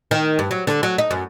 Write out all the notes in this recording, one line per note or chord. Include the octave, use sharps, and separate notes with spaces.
D#3
G2
F#3
D3
F#3
D#4
F#2